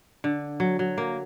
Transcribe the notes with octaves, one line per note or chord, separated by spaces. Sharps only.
D3
F#3
F#3
A#3